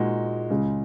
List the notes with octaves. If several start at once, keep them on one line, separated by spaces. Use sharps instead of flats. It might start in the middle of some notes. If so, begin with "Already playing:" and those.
Already playing: A#2 G#3 D#4 F#4
C#2 C#3 G#3